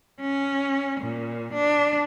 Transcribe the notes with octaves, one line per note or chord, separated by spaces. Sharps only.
C#4
A#2
D4